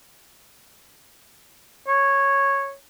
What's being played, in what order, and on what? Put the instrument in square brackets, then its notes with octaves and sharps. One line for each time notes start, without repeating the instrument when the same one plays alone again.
[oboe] C#5